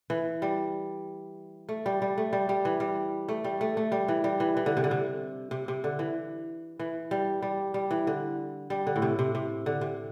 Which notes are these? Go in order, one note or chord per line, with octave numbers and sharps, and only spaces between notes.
E3
G3
A3
G3
G3
A3
G3
G3
E3
G3
A3
G3
A3
A3
G3
E3
G3
E3
E3
D3
C3
D3
C3
C3
C3
D3
E3
E3
G3
G3
G3
E3
D3
G3
D3
A2
C3
C3
C3
D3
C3